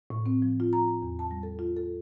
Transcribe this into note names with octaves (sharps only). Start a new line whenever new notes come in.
A2
C4
F3
F4
A#5
A#5
E2
A5
G3
A4
F4
A4